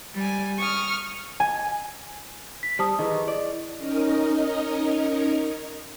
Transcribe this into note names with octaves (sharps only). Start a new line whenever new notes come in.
G3 G#5
C#6 D#6 F6
G#5
B6
G3 C5 A5 D#6
D#3 E3 E4 G#4 D#5
D5
C#4 D#4 A#4 D#5